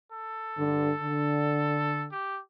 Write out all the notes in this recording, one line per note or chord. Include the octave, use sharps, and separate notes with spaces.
A4
G2 D3
D3
G4